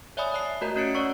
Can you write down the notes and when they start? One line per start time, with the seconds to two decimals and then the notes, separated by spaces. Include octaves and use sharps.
0.17 C#5 D5 E5 G#5 B5 D#6
0.34 C#5 E5 A5 C7
0.61 A3 F#4 A#4 D#5 A#5 G6
0.76 C#4 F#4 C#5 A6 C#7 D7
0.94 C#5 D5 F#5 C#6 E6